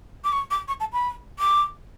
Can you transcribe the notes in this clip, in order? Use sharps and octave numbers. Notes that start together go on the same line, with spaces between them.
D6
C#6
D6
C#6
A5
B5
D6